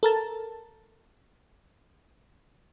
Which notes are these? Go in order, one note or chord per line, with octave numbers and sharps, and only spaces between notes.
A4 A#4 A5